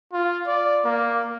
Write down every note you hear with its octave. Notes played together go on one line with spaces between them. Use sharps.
F4
D5
A#3